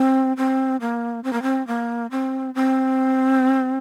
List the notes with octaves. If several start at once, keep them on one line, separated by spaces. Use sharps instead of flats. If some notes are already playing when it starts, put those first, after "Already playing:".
Already playing: C4
C4
A#3
C4
A#3
C4
A#3
C4
C4